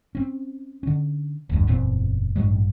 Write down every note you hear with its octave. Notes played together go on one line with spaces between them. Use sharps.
C4 C#4
D3 C#4
F1 D2 G2
F#1 E2 A#2 C4
A1 G2 F#3 G#3